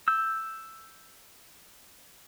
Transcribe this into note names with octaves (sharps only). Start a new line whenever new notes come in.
E6 G6